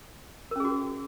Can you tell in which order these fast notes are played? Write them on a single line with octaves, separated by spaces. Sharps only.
A#4 C#4 G#4 F#4